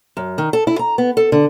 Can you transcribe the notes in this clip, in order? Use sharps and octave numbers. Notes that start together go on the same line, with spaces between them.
F#2
D#3
A4
E4
A#5
B3
A4
D3